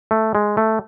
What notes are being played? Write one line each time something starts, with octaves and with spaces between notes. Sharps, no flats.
A3
G#3
A3